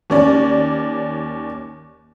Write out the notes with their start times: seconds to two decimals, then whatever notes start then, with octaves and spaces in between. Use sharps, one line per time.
0.10 D#2 C#4 D5